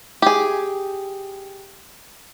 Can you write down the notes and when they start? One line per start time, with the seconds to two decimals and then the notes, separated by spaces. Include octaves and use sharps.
0.22 G4 G#4